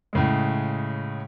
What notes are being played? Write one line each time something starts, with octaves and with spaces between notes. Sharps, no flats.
A2 C#3 G#3